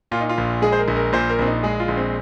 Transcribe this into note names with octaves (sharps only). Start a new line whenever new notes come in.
A#2 F4
D#4
F4
A#1
G#3 G#4
C5
A#4
A#1
A#4
A#2 C5
A#4
A#1 C4
D#4
G#3 G#4
F4
A#1
C4